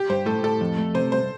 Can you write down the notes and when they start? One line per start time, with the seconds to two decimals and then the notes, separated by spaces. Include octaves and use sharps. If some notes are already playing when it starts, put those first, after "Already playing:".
Already playing: G4
0.10 G2 C5
0.26 A2 A4
0.43 A2 A4
0.61 F2
0.78 A3
0.94 C3 C5
1.12 C2 C5